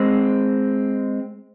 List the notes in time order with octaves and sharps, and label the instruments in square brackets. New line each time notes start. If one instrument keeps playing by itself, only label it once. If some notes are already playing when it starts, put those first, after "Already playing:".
Already playing: [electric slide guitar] G#3 C4